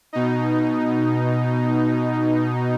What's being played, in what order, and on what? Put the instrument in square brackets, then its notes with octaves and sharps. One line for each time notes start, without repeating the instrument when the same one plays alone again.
[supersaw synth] B2 D#4